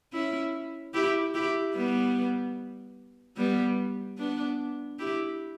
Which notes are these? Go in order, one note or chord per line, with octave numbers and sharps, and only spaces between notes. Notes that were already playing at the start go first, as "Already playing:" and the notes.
C#4 E4
E4 G4
E4 G4
G3 B3
G3 B3
B3 D4
E4 G4